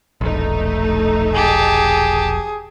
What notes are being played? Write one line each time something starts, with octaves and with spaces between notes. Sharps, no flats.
E1 A#1 A3 D#4
G4 G#4 A5